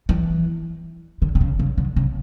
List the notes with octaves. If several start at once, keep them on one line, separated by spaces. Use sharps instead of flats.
E3
D3
D3
C#3
C#3
D3
C#3